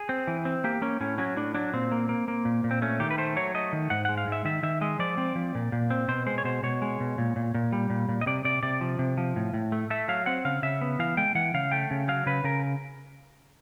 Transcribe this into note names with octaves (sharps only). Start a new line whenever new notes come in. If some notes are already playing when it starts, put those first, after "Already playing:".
Already playing: G#4
C4
E3
C4
A#3 G4
A#3 C#4
A2 C#4
F#3 C#4
A2 D4
F#3 D4
A#2 C4
A#3
A#3
A#3
A#2
A#2
C4
A3 C#4
D#3 G4
B4
A3 C5
F#3 C#5
A3 D#5
D#3
G#2 F#5
G#3 F#5
F5
G#2 E5
D#3 E5
D#3 E5
G#3 D#5
F3 D5
C4
F3
A#2
A#2
C4
B2 C5
G#3 C5
C#5
B2 C5
B2 C#5
G#3
B2
A#2
A#2
A#2
G3
A#2
A#2
D#5
C3 D5
C3 D5
C3 D5
F3
C3
F3
A2
A2
A3
A3 E5
F#3 F5
C4 F#5
C#3 F5
C#3 E5
B3
E3 F5
G#3 G5
E3 F#5
C#3 F5
A3 G5
C#3
F#3 F5
C#3 B4
C#3 A#4